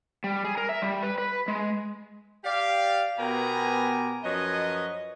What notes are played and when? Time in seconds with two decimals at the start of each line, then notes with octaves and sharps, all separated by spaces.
0.24 G3
0.44 G#4
0.57 A#4
0.69 E5
0.82 G3
1.03 B4
1.18 B4
1.48 G#3
2.44 G4 D5 F5
3.19 B2 B3 G4 A#4 G#5 A#5
4.24 F#2 F3 B4 C#5 D#5